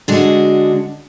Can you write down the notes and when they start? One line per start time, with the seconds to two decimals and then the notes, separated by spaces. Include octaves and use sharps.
0.08 D3 G#3 D4 F#4